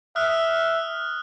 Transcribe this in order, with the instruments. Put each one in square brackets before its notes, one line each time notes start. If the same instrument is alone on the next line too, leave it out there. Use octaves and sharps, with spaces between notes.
[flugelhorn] E5 [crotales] D#6 F6 F#6